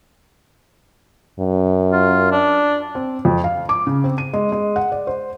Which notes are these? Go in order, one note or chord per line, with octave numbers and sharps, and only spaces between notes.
F#2
F4
D4
C4
F2
F5
D6
C#3
C4
D#7
G#3
G#3
F#5
D5
C5